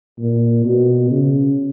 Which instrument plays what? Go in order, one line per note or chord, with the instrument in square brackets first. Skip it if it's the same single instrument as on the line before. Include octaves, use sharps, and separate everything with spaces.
[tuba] A#2
B2
C#3